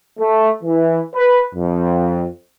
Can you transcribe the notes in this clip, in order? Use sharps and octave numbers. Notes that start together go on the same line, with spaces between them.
A3
E3
B4
F2